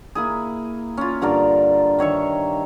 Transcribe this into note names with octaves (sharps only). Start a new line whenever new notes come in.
A#3 E4 G#4
C#4 F4
G2 D3 A#4 D5
D#3 C#5 E5 C#6